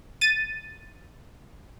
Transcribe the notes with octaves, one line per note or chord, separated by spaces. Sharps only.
A6 D#7